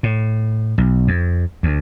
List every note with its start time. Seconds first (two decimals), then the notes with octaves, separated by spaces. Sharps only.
0.03 A2
0.78 B1
1.08 F2
1.63 D2